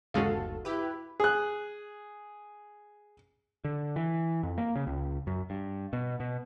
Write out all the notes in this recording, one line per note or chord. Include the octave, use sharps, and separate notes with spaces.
G1 D#2 C#3 G#3 C#4 F#4 A4 F5
E4 G4 B4
G#4 F#6
D3
E3
F2
A#3
C#3
C#2
F#2
G2
B2
B2